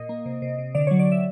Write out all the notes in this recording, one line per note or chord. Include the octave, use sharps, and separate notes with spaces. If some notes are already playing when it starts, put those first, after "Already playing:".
Already playing: A#2 D#5
A#3
C3
C3
C3
D3 D5
F#3 C#5
D5
E5